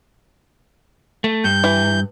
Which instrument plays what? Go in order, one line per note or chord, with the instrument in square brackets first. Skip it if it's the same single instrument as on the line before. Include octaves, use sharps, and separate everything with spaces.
[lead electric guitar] A3
[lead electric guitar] G2 [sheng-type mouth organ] G6
[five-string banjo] E3